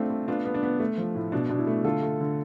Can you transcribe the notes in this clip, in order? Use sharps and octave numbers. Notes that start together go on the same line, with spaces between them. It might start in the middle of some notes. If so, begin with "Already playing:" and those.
Already playing: A3 C4 D4 F4
A3
B3 D4 F4
B3
D4
B3
A3
F3
A2
B2 D4
B2 D4
E4
A3
D3 F4 A4
A3
D3